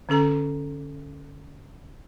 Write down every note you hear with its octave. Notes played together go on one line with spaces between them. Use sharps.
D3 C#4 A4 A#5